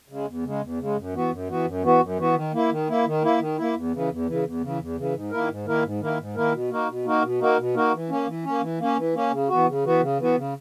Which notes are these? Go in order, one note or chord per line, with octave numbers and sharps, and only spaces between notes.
C#3 G#3
E2
C#3 G#3
E2
C#3 G#3
F#2
E3 B3 F#4
F#2
E3 B3 F#4
F#2
E3 B3 F#4
F#2
E3 B3 F#4
D#3
A#3 E4
D#3
A#3 E4
D#3
A#3 E4
D#3
A#3 E4
E2
C#3 E3
E2
C#3 E3
E2
C#3 E3
E2
C#3 E3
G#2
D#3 A#3 E4 A#4
G#2
D#3 A#3 E4 A#4
G#2
D#3 A#3 E4 A#4
G#2
D#3 A#3 E4 A#4
B2
A#3 D#4 F#4 A#4
B2
A#3 D#4 F#4 A#4
B2
A#3 D#4 F#4 A#4
B2
A#3 D#4 F#4 A#4
E3
A#3 C#4
E3
A#3 C#4
E3
A#3 C#4
E3
A#3 C#4
C#3
E3 B3 F#4
C#3
E3 B3 F#4
C#3
E3 B3 F#4
C#3